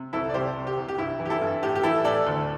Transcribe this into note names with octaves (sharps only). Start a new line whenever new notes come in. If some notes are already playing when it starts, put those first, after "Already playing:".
Already playing: C3
C2 E4 A4
D5
C2 G4 C5
C3
G4
C2
G4
G2 E4
E3
G4
E4 A4
G2
A2 G4
G4
E3 E4 A4
A2 A4 D5
D2